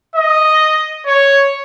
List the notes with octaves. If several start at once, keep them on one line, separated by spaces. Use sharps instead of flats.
D#5
C#5